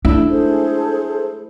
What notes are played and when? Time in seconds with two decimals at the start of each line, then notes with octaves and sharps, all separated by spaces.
0.05 A3 D4 E4
0.29 G#4 A4 C5